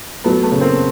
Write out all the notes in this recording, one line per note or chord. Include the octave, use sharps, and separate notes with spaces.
F#3 A3 B3
A3 B3
C#3
A#3 C4